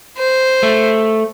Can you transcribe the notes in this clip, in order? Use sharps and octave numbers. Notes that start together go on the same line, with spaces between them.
C5
A3